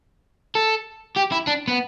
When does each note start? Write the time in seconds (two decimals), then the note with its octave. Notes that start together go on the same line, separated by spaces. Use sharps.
0.55 A4
1.16 G4
1.32 E4
1.47 D4
1.68 B3